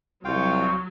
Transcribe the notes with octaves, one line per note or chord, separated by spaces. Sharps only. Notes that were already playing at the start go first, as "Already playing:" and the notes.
C2 F#3 F4 F5 G5 C#6